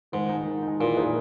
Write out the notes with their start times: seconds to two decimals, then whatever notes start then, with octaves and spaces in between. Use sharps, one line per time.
0.12 G#2 D#3
0.29 G#3 D#4
0.46 D#3
0.63 G#3 D#4
0.80 A#2 E3
0.97 A#3 D#4 G#4 B4